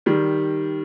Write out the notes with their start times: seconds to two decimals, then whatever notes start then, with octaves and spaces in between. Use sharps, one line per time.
0.06 D#3 G3